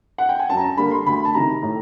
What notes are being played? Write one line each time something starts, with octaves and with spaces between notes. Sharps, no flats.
F#5
G5
G#5
F#2 A5
A#5
A5
D3 G3 A#3 B5
C6
D2 B5
A5
C3 D#3 A#5
A2